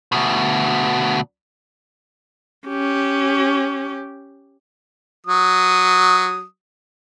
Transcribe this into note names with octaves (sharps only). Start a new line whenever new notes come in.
D2 B2
C#4 G4
F#3 D#6